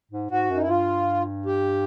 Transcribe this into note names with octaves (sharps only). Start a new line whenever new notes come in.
G#2
G#2 F#4
F#2 D#4
E4
G2 F4
G4